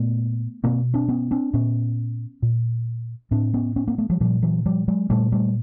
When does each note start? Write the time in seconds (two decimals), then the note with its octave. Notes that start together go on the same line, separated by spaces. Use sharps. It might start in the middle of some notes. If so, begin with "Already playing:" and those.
Already playing: A#2 A3 B3
0.64 B2 A#3 C4
0.94 C4 D4
1.09 B3 C#4
1.31 C4 D4
1.53 A#2 B3 C#4
2.42 A#2
3.31 A2 C4 D4
3.54 B3 C#4
3.76 B3 C#4
3.88 A#3 C4
3.98 A3 B3
4.10 F3 G3
4.21 A#2 F3 G3
4.42 E3 F#3
4.66 F3 G3
4.88 F#3 G#3
5.10 A#2 G3 A3
5.32 G3 A3